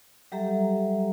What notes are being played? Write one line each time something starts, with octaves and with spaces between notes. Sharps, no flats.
F#3 G3 G4 A4 E5 A#5